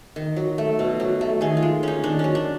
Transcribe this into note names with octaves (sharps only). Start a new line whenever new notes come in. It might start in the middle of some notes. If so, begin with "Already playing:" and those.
D#3
F#3
A3
B2
F#3
A3
D#3 G#4
F4
G#3
C#4 D#4
D#3 D4
F#3 C#4
D4